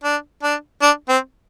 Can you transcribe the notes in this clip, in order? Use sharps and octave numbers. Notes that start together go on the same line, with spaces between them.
D4
D4
D4
C4